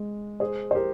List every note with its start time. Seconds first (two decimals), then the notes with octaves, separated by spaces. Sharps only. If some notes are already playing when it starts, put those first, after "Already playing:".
Already playing: G#3
0.40 G#4 C5
0.71 C5
0.75 G4 A#4